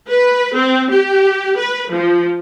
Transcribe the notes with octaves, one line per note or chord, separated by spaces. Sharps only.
B4
C4
G4
B4
F3